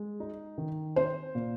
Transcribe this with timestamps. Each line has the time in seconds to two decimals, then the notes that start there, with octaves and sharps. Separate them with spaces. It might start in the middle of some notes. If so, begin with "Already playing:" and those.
Already playing: G#3
0.20 D#4
0.58 D#3
0.96 C4 C5
1.35 A#2